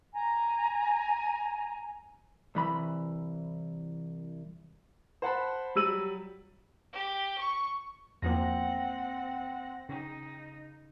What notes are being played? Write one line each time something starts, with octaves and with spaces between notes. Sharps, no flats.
G#5 A#5
C2 E3 B5
C5 F#5 A5 B5
F#3 G3 E6 D#7 F#7
G4
C#6
E2 F3 A#3 C4 F#5 A#6
C#3 D#4